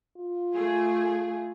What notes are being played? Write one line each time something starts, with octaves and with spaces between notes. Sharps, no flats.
F4
A3 G#4